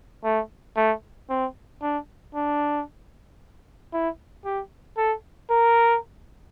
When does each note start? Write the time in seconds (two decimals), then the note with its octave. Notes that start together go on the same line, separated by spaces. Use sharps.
0.24 A3
0.76 A3
1.30 C4
1.82 D4
2.35 D4
3.93 E4
4.45 G4
4.97 A4
5.50 A#4